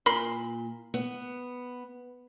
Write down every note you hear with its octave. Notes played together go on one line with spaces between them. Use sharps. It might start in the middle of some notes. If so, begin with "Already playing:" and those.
A#2 A#4 B5 C6
B3